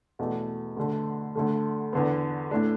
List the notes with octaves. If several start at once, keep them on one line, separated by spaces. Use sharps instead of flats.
E2 B2 A3
D2 D3 A3
D2 D3 A3
E2 D3 B3
A2 A3 D4